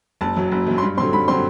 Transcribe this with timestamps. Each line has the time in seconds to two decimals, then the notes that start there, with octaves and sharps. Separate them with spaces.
0.21 F#1 A5
0.37 F#2 F#3
0.52 F#1
0.67 F#2 F#3
0.78 C6
0.82 G2 B5
0.97 D3 F#3 C4 C6
1.13 G2 B5
1.28 D3 F#3 C4 C6